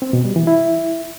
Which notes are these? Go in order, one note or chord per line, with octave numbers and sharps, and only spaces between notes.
C4
B2
G3
E3
E4